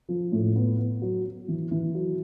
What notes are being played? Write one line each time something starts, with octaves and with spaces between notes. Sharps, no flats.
F3
A2
B3
B3
F#3
F#3
E3
E3
F#3